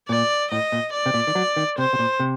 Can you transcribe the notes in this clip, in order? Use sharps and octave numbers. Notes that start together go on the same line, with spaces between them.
A#2 D5
A2 D#5
A#2
D5
C3
A#2
D#3
F#3
D#3
C3 C5
C3
A#2
C3